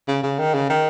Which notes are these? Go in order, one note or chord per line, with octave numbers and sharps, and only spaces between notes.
C#3
C#3
D#3
C#3
D#3